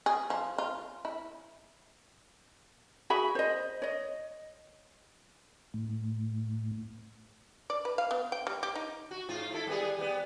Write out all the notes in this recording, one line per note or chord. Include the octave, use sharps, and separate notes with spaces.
G#4
F3
F4
E4
F#4 G#4 E5 B5
C5 D#5
C#5 D#5
A2
D5
B4
F5
B3
G5
G3
G4
D#4
F#4
G#2 F4
E4 A4
G3 B3 G#4
G3 B3